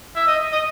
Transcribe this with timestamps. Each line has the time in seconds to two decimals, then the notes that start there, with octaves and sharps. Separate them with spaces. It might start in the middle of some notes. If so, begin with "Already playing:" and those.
0.16 E5
0.27 D#5
0.52 D#5